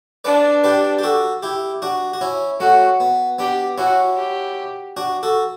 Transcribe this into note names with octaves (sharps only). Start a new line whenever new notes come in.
D4 B4 D5
G4 B4
G4
F#4 A4
E4 G4
D4 F#4
F#4
C#4 E4
A3 C#4 F#4
B3
B3 D4 G4
C#4 E4 F#4
G4
D4 F#4
F#4 A4